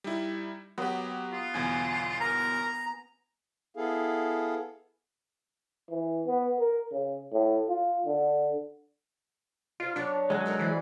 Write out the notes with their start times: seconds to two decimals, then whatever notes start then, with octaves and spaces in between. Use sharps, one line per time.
0.04 G3 D#4 E4
0.78 F#3 B3 G4
1.32 F4
1.54 G1 E2 B2 G#5
2.20 A#4 A#5
3.75 B3 E4 G#4 A4 F5
5.90 E3
6.26 B3
6.59 A#4
6.92 C#3
7.32 A2
7.69 F4
8.05 D3
9.80 D#4 F4 C5
9.96 F#3 B3 D4 C#5
10.30 F#3 G#3 A4 G#5
10.46 D#4 A4 A#4
10.59 E3 C#4 C5 D5